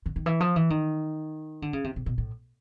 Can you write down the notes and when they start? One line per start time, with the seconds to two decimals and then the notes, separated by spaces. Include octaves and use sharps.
0.06 D3
0.16 D#3
0.26 E3
0.40 F3
0.56 E3
0.70 D#3
1.62 D3
1.73 C#3
1.84 C3
1.96 C3
2.06 B2
2.18 A2